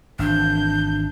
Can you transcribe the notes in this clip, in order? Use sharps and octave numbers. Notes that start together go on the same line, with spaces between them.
G#1 E3 D4 G6